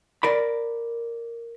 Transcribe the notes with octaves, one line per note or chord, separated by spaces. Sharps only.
A#4 D5 B5